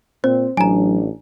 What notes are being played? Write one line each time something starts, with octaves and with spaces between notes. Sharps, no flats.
A#2 C4 C5
A1 F#3 D4 G#5 A#5